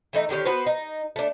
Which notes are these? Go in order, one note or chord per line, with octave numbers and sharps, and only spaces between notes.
E3 A3 D#4
D3 D#3 G4 C#5
B3 F#4 B4 C5
D#4
A3 D4